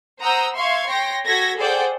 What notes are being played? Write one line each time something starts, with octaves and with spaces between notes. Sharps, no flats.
C5 F#5 A#5 D#6 E6 G6
E5 F5 C6 C#6 G#6
C#5 G5 C6 A#6
F#4 A4 G#6 A#6 B6
G#4 A4 C5 D5 F#5 G5